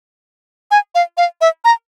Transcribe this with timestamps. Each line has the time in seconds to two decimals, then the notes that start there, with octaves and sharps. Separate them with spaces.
0.71 G#5
0.95 F5
1.17 F5
1.41 E5
1.65 A#5